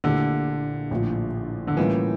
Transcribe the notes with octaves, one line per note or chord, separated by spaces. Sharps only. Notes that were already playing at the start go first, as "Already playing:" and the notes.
A#1 A#2 D3 A3 E4 G4
A#1 A2 F3
D3
A2 E3 G3 A#3 C#4 F4